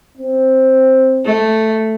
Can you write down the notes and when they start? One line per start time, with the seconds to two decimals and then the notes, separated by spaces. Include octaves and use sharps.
0.18 C4
1.25 A3